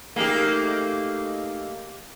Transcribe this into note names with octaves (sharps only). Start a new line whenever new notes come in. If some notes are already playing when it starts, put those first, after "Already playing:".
A3 A#3 D#4 G4 G#4